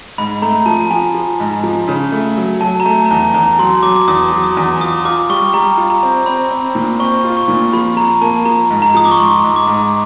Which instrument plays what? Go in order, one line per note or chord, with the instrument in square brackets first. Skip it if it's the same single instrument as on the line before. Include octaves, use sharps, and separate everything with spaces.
[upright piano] G#2 [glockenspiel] B5
[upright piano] A3 [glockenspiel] A#5
[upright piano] F3 [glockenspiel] A5
[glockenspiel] A5
[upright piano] F3 [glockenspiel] G#5
[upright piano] F3
G#2
F3
C#3
A3
F#3
[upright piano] F#3 [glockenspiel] A5
[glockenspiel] A#5
[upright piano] A3 [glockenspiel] A5
[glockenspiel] A#5
[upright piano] E2 [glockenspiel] A5
[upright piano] E2 [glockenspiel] A#5
[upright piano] F#3 [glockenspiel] C6
[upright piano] F#3 [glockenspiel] D6
[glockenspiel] D6
[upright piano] E2 [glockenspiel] D#6
[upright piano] F#3
[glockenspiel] D#6
[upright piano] E2
[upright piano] F4 [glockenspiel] D#6
[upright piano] F4 [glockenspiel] D6
[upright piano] G3 [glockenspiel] C#6
[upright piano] G3 [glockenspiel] A#5
[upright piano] F4
[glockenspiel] A#5
[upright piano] C4
[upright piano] C4 [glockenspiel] B5
[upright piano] C4
A#2
[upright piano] C4 [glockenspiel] C#6
[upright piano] F4
[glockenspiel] C#6
[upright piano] A#2
[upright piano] F3 [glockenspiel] B5
[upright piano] F3 [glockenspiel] A#5
[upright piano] A#3 [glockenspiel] A5
[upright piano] F3 [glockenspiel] A#5
[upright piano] G#2
[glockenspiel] A#5
[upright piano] F3 [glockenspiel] D#6
[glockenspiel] D6
C#6
[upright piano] G#2 [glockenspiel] C6
[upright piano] G#2
[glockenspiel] D6
[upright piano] G#2